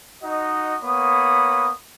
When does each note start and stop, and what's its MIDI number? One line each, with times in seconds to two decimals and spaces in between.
0.24 0.77 63
0.24 0.77 66
0.24 0.77 75
0.83 1.71 58
0.83 1.71 59
0.83 1.71 73
0.83 1.71 83
0.83 1.71 87